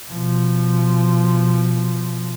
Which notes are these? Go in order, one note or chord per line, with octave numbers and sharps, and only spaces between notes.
B2 F3